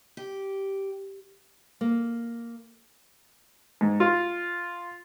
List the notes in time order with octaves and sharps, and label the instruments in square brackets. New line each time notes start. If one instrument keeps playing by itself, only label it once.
[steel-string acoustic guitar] G4
[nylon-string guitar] A#3
[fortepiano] G#2
F4